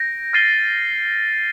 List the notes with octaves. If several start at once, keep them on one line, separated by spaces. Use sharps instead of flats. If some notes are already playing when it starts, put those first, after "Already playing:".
Already playing: G6 A#6 D7
F6 A6 C7 D#7 G7